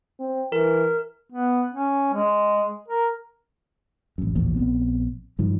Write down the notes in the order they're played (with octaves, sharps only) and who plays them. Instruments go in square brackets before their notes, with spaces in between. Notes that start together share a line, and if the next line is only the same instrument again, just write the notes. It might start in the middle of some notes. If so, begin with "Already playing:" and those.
[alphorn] C4
[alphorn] E3 [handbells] A#4
[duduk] B3
C#4
G#3
A#4
[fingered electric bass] A1 F#2
A1 D#2 A#2 F3
A#1 B3 C4
G2 D#3 F3